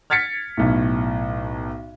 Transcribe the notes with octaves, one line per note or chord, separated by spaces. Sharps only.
F6 G#6 A6 B6 C#7
B1 A2